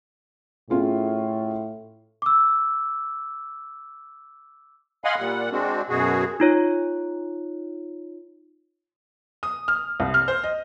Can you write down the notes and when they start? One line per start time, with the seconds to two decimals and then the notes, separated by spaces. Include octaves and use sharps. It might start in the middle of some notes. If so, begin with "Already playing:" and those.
0.70 A2 C#4 F4 G#4
2.22 D6 E6
5.05 D#5 F5 F#5 G#5 B5 C6
5.19 A#2 G3 F#5
5.52 G#3 C4 D4 F#4
5.89 F#2 B2 F#4 G#4
6.40 D#4 F4 C#5
9.43 D#6
9.68 F6
10.00 C2
10.14 F6
10.28 C5
10.43 D#5